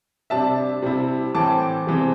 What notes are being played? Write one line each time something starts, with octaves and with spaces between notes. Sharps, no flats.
C3 G3 D4 E5 A5
C3 G3 E4
A2 E3 C4 A5 D6
E2 C3 E3 C4